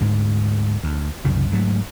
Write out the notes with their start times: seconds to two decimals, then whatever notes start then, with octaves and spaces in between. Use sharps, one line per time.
0.01 D2 G#2
0.84 D2
1.25 C2 F#2 C#3
1.52 G#2 F#3 A3